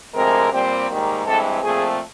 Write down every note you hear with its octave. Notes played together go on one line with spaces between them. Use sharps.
D2 C3 F3 G#3 C4 A#4
A#2 G3 C4
G#2 D#3 G3 A#3
G2 E3 G#3 C4 A4
A#2 F3 A3 C4 G#4